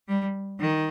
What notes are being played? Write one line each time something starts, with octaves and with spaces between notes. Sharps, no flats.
G3
D#3